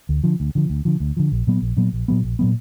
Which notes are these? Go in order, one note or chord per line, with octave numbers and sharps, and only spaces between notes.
D2
D3 F3
D2
D3 F3
D2
D3 F3
D2
D3 F3
A#1
A#2 F#3 B3
A#1
A#2 F#3 B3
A#1
A#2 F#3 B3
A#1
A#2 F#3 B3